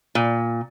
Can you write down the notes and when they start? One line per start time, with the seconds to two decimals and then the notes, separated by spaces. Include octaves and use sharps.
0.15 A#2